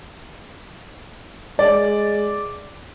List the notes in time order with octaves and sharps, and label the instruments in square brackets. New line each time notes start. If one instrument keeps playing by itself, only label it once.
[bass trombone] G#3 [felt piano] D5